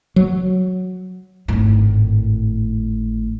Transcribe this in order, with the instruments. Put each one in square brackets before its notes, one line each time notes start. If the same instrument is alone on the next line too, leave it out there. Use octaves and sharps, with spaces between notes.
[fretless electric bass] F#3
[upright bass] G#1 A2